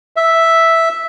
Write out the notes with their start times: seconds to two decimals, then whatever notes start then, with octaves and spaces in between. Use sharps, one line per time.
0.16 E5